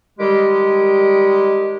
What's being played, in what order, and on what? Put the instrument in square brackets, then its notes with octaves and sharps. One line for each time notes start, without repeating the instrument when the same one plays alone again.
[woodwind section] D#3 G3 G#3 G4